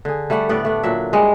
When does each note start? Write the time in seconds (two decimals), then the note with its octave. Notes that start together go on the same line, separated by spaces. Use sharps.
0.05 D3 G#4
0.30 G3 A3 G4 F#5
0.49 A2 B3 G4 D5
0.65 A3 D4
0.83 A#2 F#3 E5
1.13 G#2 G3 G#3